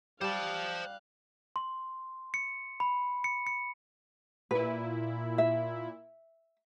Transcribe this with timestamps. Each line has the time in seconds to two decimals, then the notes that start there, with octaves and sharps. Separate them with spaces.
0.21 G3 C5 F5 A5 F#6
1.56 C6
2.34 C#7
2.80 B5
3.24 C#7
3.47 C#7
4.51 A#2 E4 B4
5.38 E5